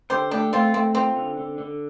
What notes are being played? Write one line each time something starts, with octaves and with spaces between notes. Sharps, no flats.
D3 G4 C5
A3 D4 G4
A3 C4 F4
A3 C4
C4 F4
D3
D3
D3